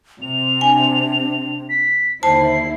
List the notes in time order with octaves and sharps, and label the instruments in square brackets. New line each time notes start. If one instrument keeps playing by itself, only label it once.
[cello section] C3 C4 [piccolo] F7
[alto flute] D4 [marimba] G#5
[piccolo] B6
[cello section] D#2 D3 E4 [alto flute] C5 [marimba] A5 [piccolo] C7